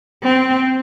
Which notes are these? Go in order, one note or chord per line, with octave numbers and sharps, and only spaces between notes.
C4